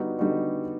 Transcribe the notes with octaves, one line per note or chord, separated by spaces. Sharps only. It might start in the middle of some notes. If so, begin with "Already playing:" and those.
Already playing: D3 G3 B3 D#4 F#4
D3 G3 B3 D#4 F#4